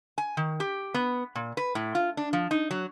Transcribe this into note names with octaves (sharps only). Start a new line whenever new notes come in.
G#5
D#3
G4
B3
A#2
B4
A2
F4
D4
F3
D#4
F#3